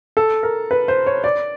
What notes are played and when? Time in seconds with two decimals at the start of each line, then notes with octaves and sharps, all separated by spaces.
0.17 A4
0.43 A#4
0.71 B4
0.88 C5
1.07 C#5
1.24 D5